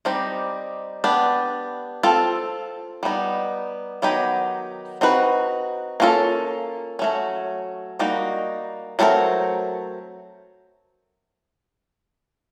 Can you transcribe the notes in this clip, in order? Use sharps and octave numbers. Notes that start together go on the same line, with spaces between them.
G3 C4 D#4 G4 C5
B3 D4 G4
C4 F4 A4
G3 B3 D#4
D#3 F#3 B3 D#4 G4
C4 D#4 F#4 B4
A#3 C#4 F4 A4
F#3 A3 C#4
G3 A#3 D#4 F#4
F#3 A3 C4 F4 A#4